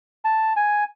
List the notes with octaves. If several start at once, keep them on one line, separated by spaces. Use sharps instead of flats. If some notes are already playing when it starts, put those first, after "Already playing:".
A5
G#5